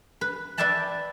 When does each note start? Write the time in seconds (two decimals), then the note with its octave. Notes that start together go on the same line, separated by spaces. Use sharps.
0.21 B4
0.57 B4 D5 E5 G5 A5 B5